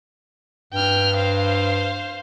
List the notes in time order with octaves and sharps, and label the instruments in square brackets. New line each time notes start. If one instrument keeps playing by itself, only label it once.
[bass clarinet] G2 [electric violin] G5 F6
[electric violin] C5 F5